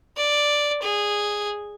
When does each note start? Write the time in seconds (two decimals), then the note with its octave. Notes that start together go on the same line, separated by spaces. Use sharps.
0.17 D5
0.83 G#4